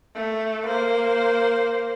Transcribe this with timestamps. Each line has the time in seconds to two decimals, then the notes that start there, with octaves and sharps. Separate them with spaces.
0.16 A3
0.66 A#3 C5